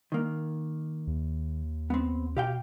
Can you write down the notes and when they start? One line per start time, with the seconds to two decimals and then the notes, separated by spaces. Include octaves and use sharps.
0.12 D#3 A#3
1.07 D#2
1.90 B3 C4
2.37 B2 G4 F5 G5